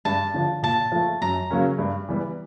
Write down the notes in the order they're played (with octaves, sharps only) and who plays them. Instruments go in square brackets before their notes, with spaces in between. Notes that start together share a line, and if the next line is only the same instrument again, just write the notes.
[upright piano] G2 [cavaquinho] A5
[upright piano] D3 F3
[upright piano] A#2 [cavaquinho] A5
[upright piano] F3 A3
[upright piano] F#2 [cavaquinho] A#5
[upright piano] C#3 F#3 A#3 C#4
G2
E3 G3 B3